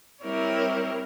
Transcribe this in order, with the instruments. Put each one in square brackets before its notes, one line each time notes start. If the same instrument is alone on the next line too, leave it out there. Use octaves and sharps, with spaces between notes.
[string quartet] G3 C4 E4 A#4 C#5